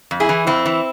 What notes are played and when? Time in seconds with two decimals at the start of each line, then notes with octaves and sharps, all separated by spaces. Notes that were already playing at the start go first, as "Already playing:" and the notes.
0.11 F2
0.20 E4 G#4
0.29 E3
0.47 F2 C4 E4
0.65 E3